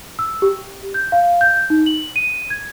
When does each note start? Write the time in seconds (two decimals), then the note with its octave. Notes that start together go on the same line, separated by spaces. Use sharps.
0.19 E6
0.42 G4
0.94 G6
1.12 F5
1.41 G6
1.70 D#4
1.86 F#7
2.16 D#7
2.50 G#6